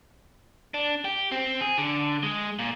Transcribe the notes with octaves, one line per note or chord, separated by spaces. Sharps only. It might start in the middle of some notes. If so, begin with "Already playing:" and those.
D4
G4
C4
G#4
D3
G#3
A#2